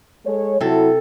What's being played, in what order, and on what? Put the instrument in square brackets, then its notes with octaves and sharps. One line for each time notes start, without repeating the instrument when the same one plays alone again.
[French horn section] G#3 A4 C#5
[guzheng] C3 A4 [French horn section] F#3 E4